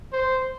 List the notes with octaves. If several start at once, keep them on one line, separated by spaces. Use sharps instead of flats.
C5